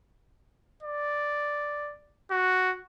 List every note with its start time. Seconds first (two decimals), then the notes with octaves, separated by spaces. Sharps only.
0.83 D5
2.31 F#4